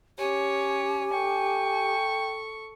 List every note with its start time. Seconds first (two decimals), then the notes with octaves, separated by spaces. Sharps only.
0.19 C#4 G4 C#5 G#5
1.13 A4 G5 C#6